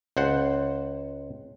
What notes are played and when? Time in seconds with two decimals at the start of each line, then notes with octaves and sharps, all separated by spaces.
0.17 C#2 C5 F#5